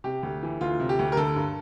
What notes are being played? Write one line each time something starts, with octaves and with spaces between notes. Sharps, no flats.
C3 G4
D2
E3
D2 F4
C3
G4
D2
A#4
D3 A4
G2